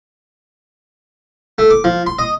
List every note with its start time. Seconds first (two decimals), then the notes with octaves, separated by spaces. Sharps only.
1.58 A3
1.70 D6
1.84 F3
2.06 C6
2.19 D#5